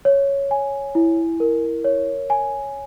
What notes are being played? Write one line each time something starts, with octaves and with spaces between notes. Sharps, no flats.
C#5
G#5
E4
A#4
C#5
G#5